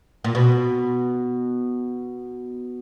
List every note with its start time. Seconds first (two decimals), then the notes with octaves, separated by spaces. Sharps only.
0.24 A#2
0.35 B2